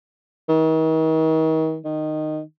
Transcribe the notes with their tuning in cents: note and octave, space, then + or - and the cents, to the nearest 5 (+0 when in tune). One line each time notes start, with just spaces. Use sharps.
D#3 +40
D#3 -15